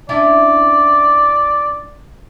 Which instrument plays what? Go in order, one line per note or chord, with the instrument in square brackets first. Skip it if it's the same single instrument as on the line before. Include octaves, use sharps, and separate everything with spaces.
[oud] C#4 D4 E4 [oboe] D5